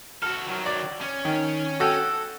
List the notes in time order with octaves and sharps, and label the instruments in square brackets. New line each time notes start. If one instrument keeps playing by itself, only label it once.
[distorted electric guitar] F#4 A4 [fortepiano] F6
[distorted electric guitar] D#3 F#3
[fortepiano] D5
[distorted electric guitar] C#4
[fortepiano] D#3
F#4 A4 G5